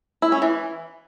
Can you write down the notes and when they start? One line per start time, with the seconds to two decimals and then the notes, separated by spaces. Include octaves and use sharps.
0.22 E4
0.32 C#4
0.42 E3